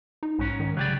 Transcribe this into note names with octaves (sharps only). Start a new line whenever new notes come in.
D#4
B1 G#2 C#4
D#3
C#3 F#3 G4 D5